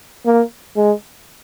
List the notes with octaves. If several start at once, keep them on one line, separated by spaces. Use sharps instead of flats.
A#3
G#3